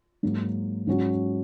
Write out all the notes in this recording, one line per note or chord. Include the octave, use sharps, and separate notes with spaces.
G#2 F#3 A#3
G#2 F#3 C#4 F#4